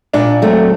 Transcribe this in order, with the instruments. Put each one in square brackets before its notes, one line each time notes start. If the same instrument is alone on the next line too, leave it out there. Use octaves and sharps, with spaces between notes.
[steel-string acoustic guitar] A#2 [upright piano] D4
[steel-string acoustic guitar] F#3 A3 C4